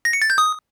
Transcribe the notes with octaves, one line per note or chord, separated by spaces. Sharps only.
A#6
C#7
A6
G6
D#6